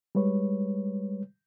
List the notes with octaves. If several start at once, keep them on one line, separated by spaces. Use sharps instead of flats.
G3 G#3 B4 C#5